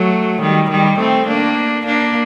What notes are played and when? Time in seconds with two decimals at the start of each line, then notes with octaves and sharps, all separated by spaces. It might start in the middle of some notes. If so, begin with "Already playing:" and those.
Already playing: F#3 A3
0.41 D#3 G3
0.70 D#3 G3
0.99 A3 C4
1.27 A#3 D4
1.86 A#3 D4